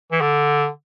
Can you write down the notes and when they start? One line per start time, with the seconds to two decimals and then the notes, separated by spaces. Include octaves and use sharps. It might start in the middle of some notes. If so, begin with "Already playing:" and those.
0.12 E3
0.21 D3